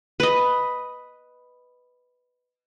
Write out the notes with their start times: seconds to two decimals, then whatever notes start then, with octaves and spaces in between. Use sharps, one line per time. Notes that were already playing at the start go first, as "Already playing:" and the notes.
0.20 B4 D#5